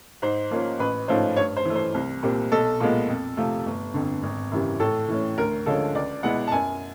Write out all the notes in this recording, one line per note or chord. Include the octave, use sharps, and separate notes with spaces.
G#2 C5
F3 A#3 C#4 F4
A1 B4
G#2 F3 A3 C#4 C5
G2 C#5
C5
E3 A3
C5
C2
A#2 G3 C4
B1 A4
A#2 F3 G#3 B3
F2
C3 F3 A3
G1
F2 D3
G#1
F#2 C#3 E3 G3
A2 A4
E3 A3 C#4
D2 A#4
D3 F3 G#3 C#4 A4
C#2 D5
B2 G#3 B3 E4 F#5
A5
F#2 G#5